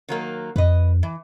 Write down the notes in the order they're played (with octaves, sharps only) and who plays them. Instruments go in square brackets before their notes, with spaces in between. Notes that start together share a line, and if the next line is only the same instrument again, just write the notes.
[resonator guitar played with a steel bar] D#3 F#3 A#3
[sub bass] F2 [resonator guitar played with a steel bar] B4 D#5
[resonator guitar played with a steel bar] E3